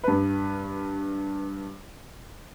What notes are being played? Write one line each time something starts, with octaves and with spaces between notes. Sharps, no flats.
G2 B4